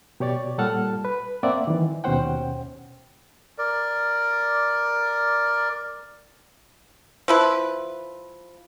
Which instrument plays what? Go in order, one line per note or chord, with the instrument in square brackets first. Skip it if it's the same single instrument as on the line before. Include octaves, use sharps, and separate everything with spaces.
[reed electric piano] B2 G4 C#5 D5 A6
A#2 G3 A4 F#5 A5 F6
B4
A#3 C4 D5 E5 F#5
D#3 E3
D#2 B2 C#4 C5 F#5 G5
[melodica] A#4 D5
[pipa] F3 E4 B4